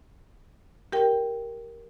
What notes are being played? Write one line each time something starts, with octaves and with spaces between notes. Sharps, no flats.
G4 A#4 G5